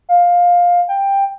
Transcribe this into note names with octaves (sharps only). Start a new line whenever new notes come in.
F5
G5